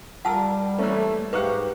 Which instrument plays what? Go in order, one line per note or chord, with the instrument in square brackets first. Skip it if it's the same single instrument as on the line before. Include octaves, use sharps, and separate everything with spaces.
[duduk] G3 [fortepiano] F4 A#4 [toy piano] F#5 A5 E6
[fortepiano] E3 A#3 C#4 [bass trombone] A3
[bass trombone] G#2 [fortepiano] D#4 F5 F#5 [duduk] G4 [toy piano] B4 C#6